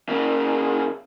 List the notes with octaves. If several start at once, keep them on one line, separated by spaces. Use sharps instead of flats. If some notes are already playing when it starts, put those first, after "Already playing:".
C#3 A#3